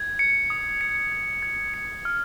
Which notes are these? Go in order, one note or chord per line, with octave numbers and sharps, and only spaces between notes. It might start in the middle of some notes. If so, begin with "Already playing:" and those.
Already playing: G#6
C#7
D#6
C#7
G#6
G#6
C#7
F6